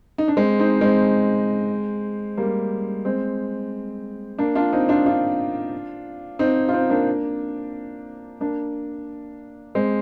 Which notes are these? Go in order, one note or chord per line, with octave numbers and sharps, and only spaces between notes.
D#4
D4
G#3 C4
C4 D#4
G#3 C4
G3 A#3
G#3 C4
A#3 D4
D4 F4
C4 D#4
D4 F4
D4 F4
C4 D#4
F4
C4 D#4
A#3 D4
A#3 D4
G#3 C4